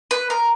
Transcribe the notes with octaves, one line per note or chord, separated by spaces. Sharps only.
B4
A#4